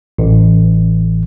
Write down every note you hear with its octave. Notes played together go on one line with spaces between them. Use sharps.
A1